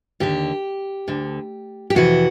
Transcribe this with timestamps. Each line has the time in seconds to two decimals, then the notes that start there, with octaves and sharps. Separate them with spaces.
0.20 D#2 D3 G4
1.08 D2 D3
1.90 G4
1.95 F2 C3 E3 F#4